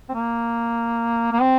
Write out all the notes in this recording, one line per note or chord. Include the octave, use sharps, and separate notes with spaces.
C4
A#3
A#3
C4